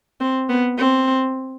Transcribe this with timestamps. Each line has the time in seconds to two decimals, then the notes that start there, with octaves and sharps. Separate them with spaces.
0.21 C4
0.49 B3
0.78 C4